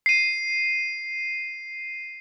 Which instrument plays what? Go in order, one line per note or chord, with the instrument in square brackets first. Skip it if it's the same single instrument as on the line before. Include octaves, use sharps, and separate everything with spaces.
[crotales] C7 D#7